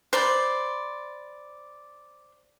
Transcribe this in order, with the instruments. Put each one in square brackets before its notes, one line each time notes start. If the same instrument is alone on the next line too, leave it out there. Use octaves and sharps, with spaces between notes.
[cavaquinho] C5 D5 B5